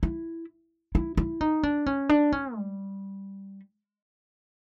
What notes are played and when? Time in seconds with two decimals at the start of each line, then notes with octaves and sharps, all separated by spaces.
0.03 E4
0.95 E4
1.17 E4
1.41 D#4
1.63 D4
1.86 C#4
2.09 D4
2.33 C#4
2.56 G3